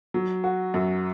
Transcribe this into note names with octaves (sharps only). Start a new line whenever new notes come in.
F#3
F#4
F#2